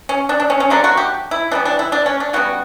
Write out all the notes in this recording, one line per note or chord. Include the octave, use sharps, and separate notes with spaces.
C#4
D4
D4
C#4
C#4
D3 F#3 A#3 D4
F#4
G4
E4
E3 G3 B3 D4
D4
E4
D4
C#4
D4
C#3 E3 G3 B3 F#4